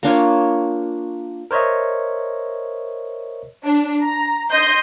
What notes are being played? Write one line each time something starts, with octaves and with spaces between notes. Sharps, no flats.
A#3 D4 F4 C#5
A#4 C5 C#5 D#5 E5
D4
A#5
D#5 C6 G6